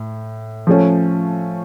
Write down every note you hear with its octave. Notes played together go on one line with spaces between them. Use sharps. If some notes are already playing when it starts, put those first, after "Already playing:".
Already playing: A2
F3 A3 C#4